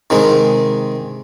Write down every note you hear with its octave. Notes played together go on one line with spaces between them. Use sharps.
C3 D#3 G#3